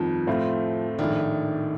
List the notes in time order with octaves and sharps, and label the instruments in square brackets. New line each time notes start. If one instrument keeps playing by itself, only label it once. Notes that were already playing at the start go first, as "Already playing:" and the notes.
Already playing: [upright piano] G1 F2 D#3 [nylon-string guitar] F3
[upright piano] A2 A3 C4 F4
[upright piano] A#1 A2 A3 D4 [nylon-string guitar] D#3